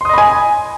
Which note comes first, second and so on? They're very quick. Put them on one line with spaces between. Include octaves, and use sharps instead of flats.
C6 D#6 D#5 B5 G#5